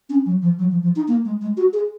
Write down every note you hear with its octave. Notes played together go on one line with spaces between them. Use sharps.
C#4
F#3
F3
F#3
F3
F3
D#4
A#3
G#3
G#3
F#4
G#4